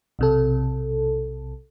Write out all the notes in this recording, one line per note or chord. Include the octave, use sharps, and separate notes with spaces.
B1 C3 A4